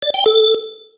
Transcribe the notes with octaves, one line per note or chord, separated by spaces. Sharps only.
D5
G5
A4